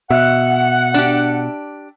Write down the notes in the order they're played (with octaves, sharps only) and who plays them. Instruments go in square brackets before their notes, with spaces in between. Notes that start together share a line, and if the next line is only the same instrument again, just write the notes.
[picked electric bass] B2 [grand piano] E5 [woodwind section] F#5
[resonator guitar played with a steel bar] D4 G4